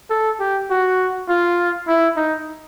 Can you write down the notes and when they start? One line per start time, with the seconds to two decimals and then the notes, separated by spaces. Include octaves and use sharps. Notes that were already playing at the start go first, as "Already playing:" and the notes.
0.10 A4
0.39 G4
0.70 F#4
1.29 F4
1.88 E4
2.17 D#4